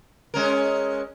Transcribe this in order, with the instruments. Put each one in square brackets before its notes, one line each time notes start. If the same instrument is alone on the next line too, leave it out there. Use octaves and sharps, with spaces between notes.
[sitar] G#3 C#4 A#4